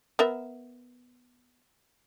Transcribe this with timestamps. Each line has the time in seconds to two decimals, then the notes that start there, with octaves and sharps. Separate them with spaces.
0.19 B3 A#4 E5